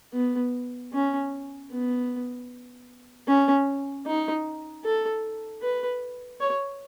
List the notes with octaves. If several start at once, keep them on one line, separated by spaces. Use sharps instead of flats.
B3
C#4
B3
C#4
D#4
A4
B4
C#5